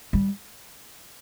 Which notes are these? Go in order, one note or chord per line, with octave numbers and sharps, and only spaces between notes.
G3